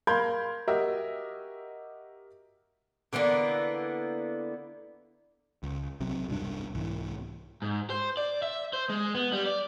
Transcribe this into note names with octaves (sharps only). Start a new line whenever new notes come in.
A#4 F5 B5 C6 G6 G#6
F#4 G4 A#4 D#5 E5
D3 E3 A#3 B3
C#2
B1 C3 F#3 C4
E1 C2 G2 D4
C2 G#2 E3
G#2
C5
D5
E5
C5
G#3
B3
G3
D5